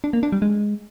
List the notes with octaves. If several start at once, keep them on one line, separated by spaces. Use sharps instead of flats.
D4
A#3
D4
G3
G#3